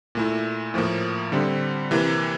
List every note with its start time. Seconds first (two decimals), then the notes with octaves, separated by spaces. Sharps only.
0.15 A#2 A3 E4
0.74 A2 F3 A#3
1.32 D3 G3 C4
1.91 C3 E3 A#3